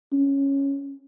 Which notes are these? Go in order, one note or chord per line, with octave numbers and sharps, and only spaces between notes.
C#4